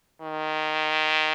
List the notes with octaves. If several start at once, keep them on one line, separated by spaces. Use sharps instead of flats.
D#3